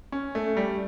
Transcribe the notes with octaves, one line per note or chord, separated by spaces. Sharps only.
C#4
A3
G3